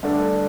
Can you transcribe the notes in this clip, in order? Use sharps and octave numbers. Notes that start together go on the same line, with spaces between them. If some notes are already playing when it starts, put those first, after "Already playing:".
G2 D3 A3 D4